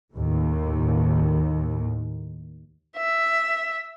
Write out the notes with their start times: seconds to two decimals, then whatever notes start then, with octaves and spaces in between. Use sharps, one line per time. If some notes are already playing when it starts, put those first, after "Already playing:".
0.12 D#2 A2
2.97 E5